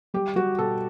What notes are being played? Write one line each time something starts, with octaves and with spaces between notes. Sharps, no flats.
G3 G4
G3 F#4
B2 A4